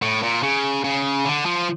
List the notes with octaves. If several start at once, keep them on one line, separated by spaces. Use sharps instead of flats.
A2
A#2
C#3
C#3
D3
F3